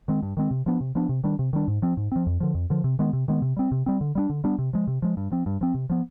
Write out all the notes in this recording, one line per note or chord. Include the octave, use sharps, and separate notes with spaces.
D#3 G#3 C4
G2
D#3 G#3 C4
C3
F3 B3 D4
C3
F3 B3 D4
C3
D#3 G3 D4
C3
D#3 G3 D4
G#2
F3 C4
G#2
F3 C4
F2
D3 F3
F2
D3 F3
C3
D#3 G#3 B3
C3
D#3 G#3 B3
C3
G3 C4
C3
G3 C4
D3
G3 B3 D4
D3
G3 B3 D4
C3
F3 G#3
C3
F3 G#3
G2
F3 C4
G2
F3 C4
C3
F3 B3